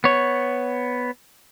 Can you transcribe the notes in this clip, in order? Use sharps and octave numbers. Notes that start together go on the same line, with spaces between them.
B3 C#5